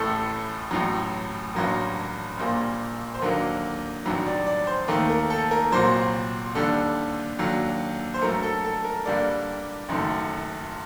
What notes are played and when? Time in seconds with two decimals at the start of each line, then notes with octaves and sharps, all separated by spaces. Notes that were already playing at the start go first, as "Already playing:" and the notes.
Already playing: A1 A2 A3 A4
0.71 A1 A2 F#3
1.55 A1 G2 F#3 A#3
2.38 A#1 A#2 G3 A#3
3.14 C5
3.21 D#2 D3 F#3 A#3 A#4
4.06 A1 G2 D#3 F#3
4.27 D5
4.47 D5
4.67 C5
4.88 D#2 D#3 A3 A#4
5.10 A#4
5.30 A4
5.51 A#4
5.72 C2 A#2 F#3 C5
6.55 D#2 D3 G3 A4
7.39 D#2 D3 F#3
8.14 C5
8.22 G2 F#3 A3 A#4
8.43 A4
8.64 A4
8.85 A#4
9.06 G2 D3 G3 A#3 D5
9.89 F#1 F#2 D#3 A3